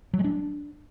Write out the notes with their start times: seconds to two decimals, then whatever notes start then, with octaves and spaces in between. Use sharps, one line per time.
0.14 F#3
0.19 G#3
0.24 D4